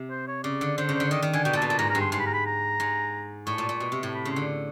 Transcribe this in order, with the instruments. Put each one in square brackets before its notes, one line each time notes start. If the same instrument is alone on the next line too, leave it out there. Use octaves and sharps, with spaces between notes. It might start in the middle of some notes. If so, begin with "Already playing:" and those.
Already playing: [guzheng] C3
[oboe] C5
C#5
[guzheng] C#3 [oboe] D5
[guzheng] D3
[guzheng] D3 [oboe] C5
[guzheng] C#3
[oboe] C5
[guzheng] D3
[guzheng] D#3 [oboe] D#5
[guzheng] D#3
[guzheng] D3 [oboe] G#5
[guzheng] B2 [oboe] G5
[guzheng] A#2 [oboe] A5
[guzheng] B2
[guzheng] A#2 [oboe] A5
[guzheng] G#2 [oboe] A#5
[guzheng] G2 [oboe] A#5
[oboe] C6
[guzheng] G#2 [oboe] C6
[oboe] B5
A#5
B5
A#5
[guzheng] G#2
[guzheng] A2 [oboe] C#6
[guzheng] A#2
A#2
B2
C3
A2
[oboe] B5
[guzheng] C#3
[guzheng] D3 [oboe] C6